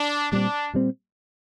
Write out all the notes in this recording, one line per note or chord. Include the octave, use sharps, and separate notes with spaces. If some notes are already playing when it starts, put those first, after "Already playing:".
Already playing: D4
A#2 G3 C4 D4
A#2 G3 C4